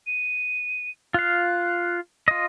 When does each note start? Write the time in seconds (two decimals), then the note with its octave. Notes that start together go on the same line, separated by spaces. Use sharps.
0.07 D#7
1.14 F4 F5 F#6
2.28 F4 D#5